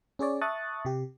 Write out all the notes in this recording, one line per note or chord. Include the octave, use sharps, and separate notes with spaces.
C#4 G#4 C#5 D5
E5 A5 C#6 D#6 F#6 A6
C3 G4